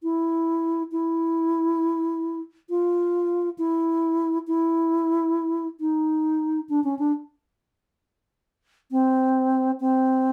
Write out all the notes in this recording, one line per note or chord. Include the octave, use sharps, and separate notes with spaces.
E4
E4
F4
E4
E4
D#4
D4
C#4
D4
C4
C4